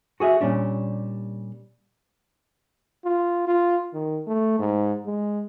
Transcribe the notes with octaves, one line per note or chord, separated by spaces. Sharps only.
F#4 G#4 C#5 E5
A#2 G3 C#4 D4
F4
F4
D#3
A3
G#2
G#3